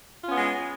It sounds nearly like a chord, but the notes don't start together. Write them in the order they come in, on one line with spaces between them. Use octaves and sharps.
F4 C#4 B3 G#3